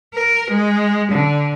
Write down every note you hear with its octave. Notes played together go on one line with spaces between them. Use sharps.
A#4
G#3
D3